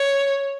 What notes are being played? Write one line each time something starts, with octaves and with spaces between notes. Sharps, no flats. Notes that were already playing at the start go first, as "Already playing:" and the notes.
Already playing: C#5